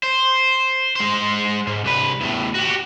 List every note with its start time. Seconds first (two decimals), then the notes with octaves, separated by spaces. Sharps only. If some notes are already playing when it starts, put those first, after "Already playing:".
0.03 C5
0.96 G#3 C5
1.67 G#2
1.85 C2 B4
2.20 E2 A2
2.55 F#4 G4